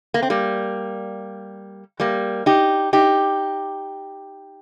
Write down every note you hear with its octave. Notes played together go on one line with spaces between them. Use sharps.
A#3
C4
G3 A#3
G3 A#3
D#4 G4
D#4 G4